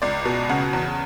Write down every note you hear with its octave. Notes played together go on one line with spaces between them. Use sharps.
C#2 D5
B2
C#3 F#5
E2